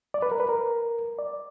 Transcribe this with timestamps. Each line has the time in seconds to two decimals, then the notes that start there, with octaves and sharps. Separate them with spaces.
0.14 D5
0.22 B4
0.31 A#4
0.40 B4
0.49 A#4
1.19 D5